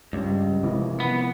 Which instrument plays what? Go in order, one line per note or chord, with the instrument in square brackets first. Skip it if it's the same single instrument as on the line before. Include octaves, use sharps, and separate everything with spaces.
[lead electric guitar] C#2 [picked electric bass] G2 G3
[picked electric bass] C3 E3 F3
[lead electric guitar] B3